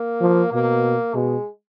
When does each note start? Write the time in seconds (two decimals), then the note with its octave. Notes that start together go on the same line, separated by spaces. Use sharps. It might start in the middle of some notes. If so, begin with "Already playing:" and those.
Already playing: A#3
0.21 F3
0.53 B2 A#3
1.14 B2 G#3